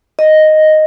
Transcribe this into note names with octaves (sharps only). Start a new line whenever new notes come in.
D#5